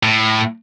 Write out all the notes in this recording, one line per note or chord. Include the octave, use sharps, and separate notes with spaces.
A2